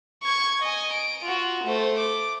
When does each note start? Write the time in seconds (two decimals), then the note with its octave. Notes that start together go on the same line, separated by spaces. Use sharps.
0.23 C#6 G#6
0.62 D#5 G#5
0.93 D7
1.24 F4 F#4
1.64 A3 C5
1.98 D6